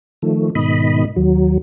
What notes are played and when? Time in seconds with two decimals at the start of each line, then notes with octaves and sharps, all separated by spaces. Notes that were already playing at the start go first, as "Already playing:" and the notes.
0.22 D#3 F3 A3
0.55 G#2 B2 D#3 D#5 B5
1.16 D#2 F#3